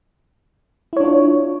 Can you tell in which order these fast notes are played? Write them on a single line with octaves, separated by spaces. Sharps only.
E4 C#5 D4 F4